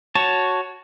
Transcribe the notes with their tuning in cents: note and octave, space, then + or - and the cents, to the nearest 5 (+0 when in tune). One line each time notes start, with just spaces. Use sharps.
F#4 +0 C#5 +0 A5 +0